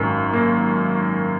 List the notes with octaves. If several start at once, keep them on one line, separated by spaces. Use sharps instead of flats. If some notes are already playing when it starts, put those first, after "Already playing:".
Already playing: G#1 F#2 D#3
A#3